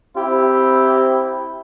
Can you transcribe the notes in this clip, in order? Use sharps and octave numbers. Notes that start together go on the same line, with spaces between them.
C4 E4 G4